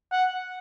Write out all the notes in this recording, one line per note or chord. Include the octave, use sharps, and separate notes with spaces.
F#5